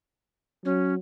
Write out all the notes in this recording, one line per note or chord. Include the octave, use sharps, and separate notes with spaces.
F#3 C#4